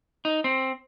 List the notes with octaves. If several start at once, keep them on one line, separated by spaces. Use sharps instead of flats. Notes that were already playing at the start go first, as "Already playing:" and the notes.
D#4
C4